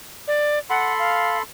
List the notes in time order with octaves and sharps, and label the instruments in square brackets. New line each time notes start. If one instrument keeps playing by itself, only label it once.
[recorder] D5
[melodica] A4 B5 C6 [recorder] F#5
[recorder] F5